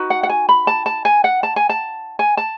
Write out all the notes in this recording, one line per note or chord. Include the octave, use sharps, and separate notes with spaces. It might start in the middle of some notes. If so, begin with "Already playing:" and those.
Already playing: D#4 F#4 B4
F#5
F#5
G#5
B5
A5
A5
G#5
F#5
A5
G#5
A5
G#5
A5